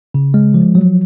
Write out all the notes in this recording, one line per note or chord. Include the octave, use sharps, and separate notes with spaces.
C#3
G#3
F3
F#3